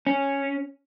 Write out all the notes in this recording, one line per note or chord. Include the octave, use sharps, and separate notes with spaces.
C#4